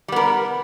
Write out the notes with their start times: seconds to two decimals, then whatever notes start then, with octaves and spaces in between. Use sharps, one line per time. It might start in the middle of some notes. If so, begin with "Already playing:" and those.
0.08 G3
0.12 B3
0.16 A#4